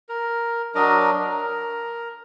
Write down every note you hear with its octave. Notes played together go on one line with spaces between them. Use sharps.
A#4
F#3 D4 A#4 D#5
A#4